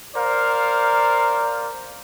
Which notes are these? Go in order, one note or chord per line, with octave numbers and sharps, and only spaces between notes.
A#4 C5 D5 F5